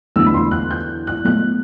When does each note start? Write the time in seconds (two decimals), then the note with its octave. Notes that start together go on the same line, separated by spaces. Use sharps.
0.16 E2 D3 F#3 A3 E6
0.26 B5
0.34 C6
0.51 F#6
0.71 G6
1.07 F#6
1.25 B2 F#3 A3 F#6